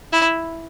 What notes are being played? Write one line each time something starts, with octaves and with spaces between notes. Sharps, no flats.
E4